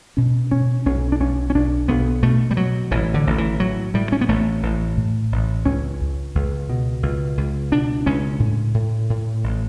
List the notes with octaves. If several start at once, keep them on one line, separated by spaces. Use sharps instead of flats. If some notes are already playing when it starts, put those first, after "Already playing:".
B2 C#4
B2 C#4
B1 C#4
D4
B1 C#4
C#4
B1 D4
B1 B3
B2 A3
G3
B2 F#3
A1 E3
D3
A1
E3
A2 F#3
A2 G3
C#4
B3
A1 A3
A1
A2
A1
C#2 C#4
C#2
C#2
B2
C#2
C#2
B2 D4
C#2 C#4
A2
A2
A2
A1